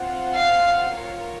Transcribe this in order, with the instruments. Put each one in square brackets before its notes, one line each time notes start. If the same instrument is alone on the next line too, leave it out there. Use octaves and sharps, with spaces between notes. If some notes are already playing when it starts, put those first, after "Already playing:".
Already playing: [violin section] C4 F4 C5 F#5
[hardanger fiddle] F5
[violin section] F4 A#4 C#5